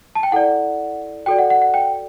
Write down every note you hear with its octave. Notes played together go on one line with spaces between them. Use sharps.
A5
G5
E4 A4 D5 F#5
F#4 A4 D5 G5
F#5
F#5
F#5
G5